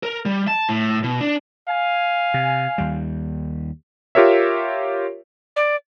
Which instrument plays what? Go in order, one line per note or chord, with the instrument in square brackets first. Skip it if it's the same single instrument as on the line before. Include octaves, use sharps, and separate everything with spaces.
[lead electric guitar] A#4
G3
A5
A2
B2
D4
[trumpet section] F5 G#5
[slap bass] C3
D#2 G3
[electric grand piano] F4 G4 A#4 C#5 E5
[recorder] D5